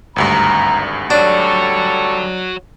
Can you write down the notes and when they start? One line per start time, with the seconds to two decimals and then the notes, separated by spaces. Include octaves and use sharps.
0.16 G#1 D2 G2 A#5
1.10 G3 D4 F#4 A4 C#5 C#6